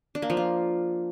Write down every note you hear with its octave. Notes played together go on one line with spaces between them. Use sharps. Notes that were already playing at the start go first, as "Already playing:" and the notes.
D4
A#3
F3
F4